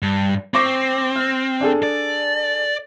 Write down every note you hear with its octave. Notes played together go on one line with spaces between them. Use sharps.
G2
C4 C#6 D6 A#6
F6
D4 G#4 A4
D5